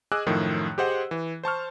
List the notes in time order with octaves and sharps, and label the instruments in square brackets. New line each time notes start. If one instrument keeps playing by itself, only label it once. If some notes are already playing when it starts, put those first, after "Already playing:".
[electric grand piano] G#4 D#5 G#5 D6 E6 F#6
F#2 A2 D#3 F3
G4 G#4 C5 D#5 F#5
E3
C5 A5 C#6 F6